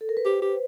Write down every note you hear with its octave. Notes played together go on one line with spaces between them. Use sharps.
A4
A#4
B4
G4 C5
G4